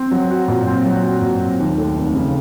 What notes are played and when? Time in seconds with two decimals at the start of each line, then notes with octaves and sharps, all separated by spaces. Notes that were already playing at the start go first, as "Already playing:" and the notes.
Already playing: C4
0.11 F#3
0.31 F#4
0.48 A#2
0.67 C4
0.85 F#3
1.03 F#4
1.22 A#2
1.40 C4
1.60 D#2
1.78 A3
1.97 F1
2.15 C#3